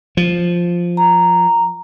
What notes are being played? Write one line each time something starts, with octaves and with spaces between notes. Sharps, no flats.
F3
A#5